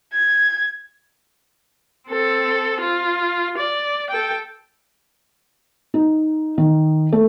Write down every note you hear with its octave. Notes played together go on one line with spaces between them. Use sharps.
G#6
C4 A4
F4
D5
A4 G5
D#4
D#3
A3